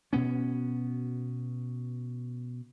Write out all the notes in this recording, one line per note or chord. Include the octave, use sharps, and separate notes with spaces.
B2 B3 C#4